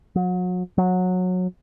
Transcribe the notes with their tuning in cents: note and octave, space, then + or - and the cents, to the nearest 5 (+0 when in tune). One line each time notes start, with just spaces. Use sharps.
F#3 -35
F#3 -20